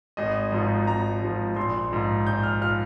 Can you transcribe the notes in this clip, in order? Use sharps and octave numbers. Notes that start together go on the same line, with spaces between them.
G#1 D#5
G#2 F3
G#1 A#5
G#2 F3
A#1 C6
G#2 F3
A#1 G6
F6
F3 F6